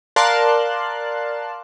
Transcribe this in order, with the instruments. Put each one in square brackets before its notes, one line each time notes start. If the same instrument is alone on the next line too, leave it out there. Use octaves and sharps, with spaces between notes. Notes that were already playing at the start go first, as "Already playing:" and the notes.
[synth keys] A#4 D5 F5 A5 C6 F#6